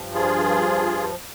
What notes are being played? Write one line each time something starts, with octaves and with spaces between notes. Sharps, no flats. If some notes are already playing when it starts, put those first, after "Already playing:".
Already playing: G2 F3
F4 G#4